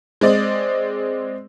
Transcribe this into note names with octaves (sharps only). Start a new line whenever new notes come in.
G#3 C4 D5 D#5